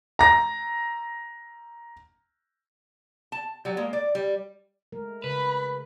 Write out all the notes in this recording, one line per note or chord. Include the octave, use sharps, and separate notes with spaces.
A#5 A#6
A5
F#3 G3
G#3 A#3
D5
G3
G#3 A3 A#4
C#3 B4 B5